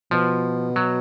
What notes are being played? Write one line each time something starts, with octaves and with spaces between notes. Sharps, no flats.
B2 F3
F#3